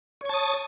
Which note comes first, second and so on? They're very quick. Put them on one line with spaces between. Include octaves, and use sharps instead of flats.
C#5 C#6 A5 D#6